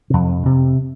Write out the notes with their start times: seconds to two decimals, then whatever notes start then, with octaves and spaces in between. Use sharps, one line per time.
0.10 F2 C3
0.43 F2 C3